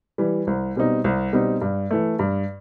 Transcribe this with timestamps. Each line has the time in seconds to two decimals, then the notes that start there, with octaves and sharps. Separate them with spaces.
0.18 E3 G3
0.47 C2
0.76 B2 G3 C4 D#4
1.04 C2
1.32 B2 G3 C4 D#4
1.62 G2
1.91 E3 A3
2.19 G2